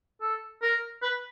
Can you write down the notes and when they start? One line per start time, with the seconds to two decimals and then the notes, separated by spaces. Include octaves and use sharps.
0.21 A4
0.62 A#4
1.02 B4